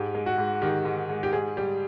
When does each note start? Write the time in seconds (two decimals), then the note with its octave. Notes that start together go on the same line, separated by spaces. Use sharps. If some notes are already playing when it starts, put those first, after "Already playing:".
Already playing: G#2 G4
0.15 G#3
0.26 F#4
0.38 G#2
0.62 D#3 G4
0.85 G#2
1.09 G#3
1.23 G4
1.33 G#2 G#4
1.57 G3 G4